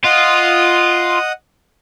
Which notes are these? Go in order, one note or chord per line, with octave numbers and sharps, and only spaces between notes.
F4 D#5 F#5 D#6